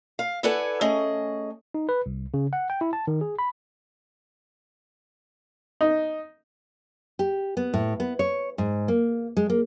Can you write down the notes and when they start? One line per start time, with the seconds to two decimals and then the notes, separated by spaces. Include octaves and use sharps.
0.19 F5
0.43 E4 A4 B4 D5 F#5 G#5
0.81 A3 C#4 G#4 D#5
1.74 D#4
1.89 B4
2.06 C2
2.34 C#3
2.53 F#5
2.70 G5
2.81 E4
2.93 A5
3.07 D#3
3.21 G#4
3.39 B5
5.81 D#4
7.19 G4
7.57 B3
7.74 A2
8.00 B3
8.19 C#5
8.58 G#2
8.88 A#3
9.37 G#3
9.50 A#3